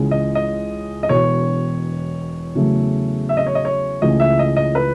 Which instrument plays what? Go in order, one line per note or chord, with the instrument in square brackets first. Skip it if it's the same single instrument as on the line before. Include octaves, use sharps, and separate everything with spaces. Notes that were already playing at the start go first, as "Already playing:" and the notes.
Already playing: [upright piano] C#2 C#3 E3 G#3
D#5
D#5
D#5
E1 E2 B2 C#5
E2 C#3 F#3 A3
E5
D#5
C#5
D#5
C#5
C#2 C#3 E3 A3 D#5
E5
D#5
D#5
B4